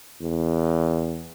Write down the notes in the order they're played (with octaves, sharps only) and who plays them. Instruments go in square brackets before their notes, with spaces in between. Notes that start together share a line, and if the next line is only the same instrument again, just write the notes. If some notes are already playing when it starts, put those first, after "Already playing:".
[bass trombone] E2